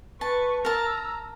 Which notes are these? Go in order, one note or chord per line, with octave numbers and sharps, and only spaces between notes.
B4 A5 C#6
A#4 A5 A#5 E6